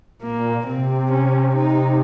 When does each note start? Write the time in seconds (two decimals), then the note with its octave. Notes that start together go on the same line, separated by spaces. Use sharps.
0.22 A#2 A#3
0.66 C3 C4
1.12 C#4
1.56 D#4